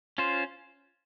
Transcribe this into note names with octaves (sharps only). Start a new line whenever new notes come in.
C#4 F4 C5